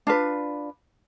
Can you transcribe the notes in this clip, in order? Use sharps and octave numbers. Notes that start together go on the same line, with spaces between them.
D4 F4 B4